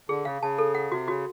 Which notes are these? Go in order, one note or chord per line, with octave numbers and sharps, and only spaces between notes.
D3 G#4
C#3 F5
C#3 A5
A4
F#5
C3 F#4
C#3 F#4